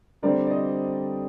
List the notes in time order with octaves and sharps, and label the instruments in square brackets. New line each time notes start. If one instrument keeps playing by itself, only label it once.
[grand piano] D3 G3 C4 [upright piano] A#4 D5
[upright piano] D5
C5 D#5